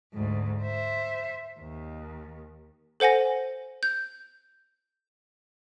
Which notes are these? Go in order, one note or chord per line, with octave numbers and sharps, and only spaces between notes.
D2 G#2
C5 E5
D#2
A4 C5 F#5 G#5 A#6
G6